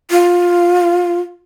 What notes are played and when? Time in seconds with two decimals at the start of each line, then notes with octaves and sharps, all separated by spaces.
0.11 F4